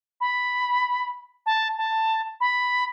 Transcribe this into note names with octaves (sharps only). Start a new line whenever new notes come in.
B5
A5
A5
B5